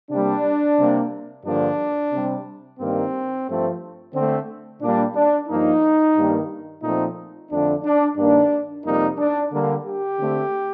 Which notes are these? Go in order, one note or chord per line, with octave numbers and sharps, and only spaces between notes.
C3 G3 A#3 D4
C3 G3 A#3
G2 D3 F3 A#3 D4
C3 G3 C4
G2 D#3 G3 A#3 C4
G2 F3 A3 C4
D3 A3 C4
A#2 G3 A#3 D4
D4
G2 F3 A#3 D#4
G2 D#3 G3 A#3
A#2 F3 A3 C4 D#4
F2 D3 A3 D4
D4
G2 D#3 A#3 D4
F2 C3 G3 A#3 D#4
D4
D3 G3 A#3
G4
D3 A3 C4